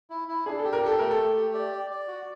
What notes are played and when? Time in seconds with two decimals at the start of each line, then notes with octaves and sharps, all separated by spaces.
0.10 E4
0.28 E4
0.46 D4 G#4
0.59 A4
0.64 G4
0.73 A#4
0.83 G4 A4
0.99 A3 A#4
1.11 A4
1.18 A3
1.36 G4
1.54 D5
1.73 D5
1.91 D5
2.08 F#4